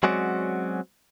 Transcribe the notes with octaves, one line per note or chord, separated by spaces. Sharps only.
F#3 G#3 C4 C#4 F#4 D5